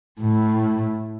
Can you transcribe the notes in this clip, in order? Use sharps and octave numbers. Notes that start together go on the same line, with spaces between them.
A2